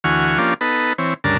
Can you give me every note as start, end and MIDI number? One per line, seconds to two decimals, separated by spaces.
0.04 0.38 38
0.04 0.38 52
0.04 0.38 66
0.04 0.38 80
0.04 0.38 85
0.04 0.38 89
0.38 0.54 53
0.38 0.54 58
0.38 0.54 61
0.38 0.54 62
0.38 0.54 65
0.38 0.54 67
0.61 0.93 59
0.61 0.93 63
0.61 0.93 69
0.61 0.93 71
0.98 1.14 52
0.98 1.14 60
0.98 1.14 73
1.24 1.37 38
1.24 1.37 43
1.24 1.37 49
1.24 1.37 62
1.24 1.37 70
1.24 1.37 81